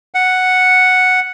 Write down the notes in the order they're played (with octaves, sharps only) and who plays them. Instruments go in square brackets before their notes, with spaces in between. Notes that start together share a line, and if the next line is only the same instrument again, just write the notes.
[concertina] F#5